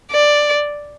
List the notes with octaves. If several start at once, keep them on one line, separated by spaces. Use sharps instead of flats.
D5